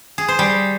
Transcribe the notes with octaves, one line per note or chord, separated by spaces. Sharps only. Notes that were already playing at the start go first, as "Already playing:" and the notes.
G#4
C5
G3